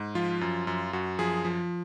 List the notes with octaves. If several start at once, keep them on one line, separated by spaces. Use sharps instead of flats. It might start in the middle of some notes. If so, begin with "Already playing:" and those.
Already playing: G#2
F3 F4
F#2
F#2
F#2 F#4
F3 G#4
F3